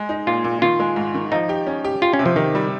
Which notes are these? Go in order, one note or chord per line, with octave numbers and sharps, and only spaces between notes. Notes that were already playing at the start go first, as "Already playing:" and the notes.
Already playing: G#3
D#4
A#2 F4
A#2
D#3 F4
G#3
G#2
D#3
F3 D#4
G4
C#4
G4
F4 G4
C#4
C3
F3
D#3 G4
G3